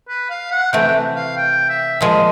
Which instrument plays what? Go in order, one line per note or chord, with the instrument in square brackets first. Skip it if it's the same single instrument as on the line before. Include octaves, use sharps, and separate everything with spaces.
[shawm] B4
F5
F#5
[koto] C3 E3 A3 [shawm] G5
[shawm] F5
G5
E5
[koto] A#2 F3 G#3 [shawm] D#5